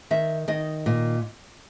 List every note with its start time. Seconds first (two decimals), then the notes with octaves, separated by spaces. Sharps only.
0.11 D#3 E5
0.48 D#3 D#5
0.86 A#2